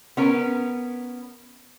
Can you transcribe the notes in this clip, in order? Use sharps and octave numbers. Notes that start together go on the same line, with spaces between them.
B3 C#4 A#4 B4